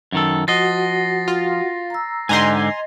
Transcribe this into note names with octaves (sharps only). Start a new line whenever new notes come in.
F#2 D#3 A4
F3 F#4 D#5 F#5 A6 A#6 C7
F4
A#5 E6
G#2 D3 G4 D#5 G#5 A#5 C6